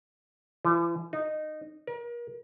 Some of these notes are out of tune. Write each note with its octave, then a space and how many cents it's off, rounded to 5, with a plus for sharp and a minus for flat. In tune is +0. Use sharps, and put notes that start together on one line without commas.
E3 +45
D#4 -15
A#4 +35